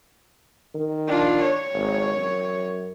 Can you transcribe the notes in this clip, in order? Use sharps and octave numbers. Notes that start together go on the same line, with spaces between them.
D#3
D4 F4
C#5
G#1
F#2